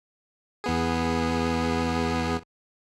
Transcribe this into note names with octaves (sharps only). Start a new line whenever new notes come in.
E2 B3 G#4